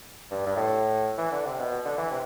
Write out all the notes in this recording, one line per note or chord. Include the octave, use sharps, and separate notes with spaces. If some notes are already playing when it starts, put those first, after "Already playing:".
G2
G2
A2
E3
D3
C3
B2
D3
E3
C3